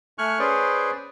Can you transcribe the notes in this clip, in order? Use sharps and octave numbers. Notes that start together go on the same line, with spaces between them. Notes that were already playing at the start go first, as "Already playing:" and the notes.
A3 G#5 C#6 F6 F#6
C#4 G#4 B4 C5 D5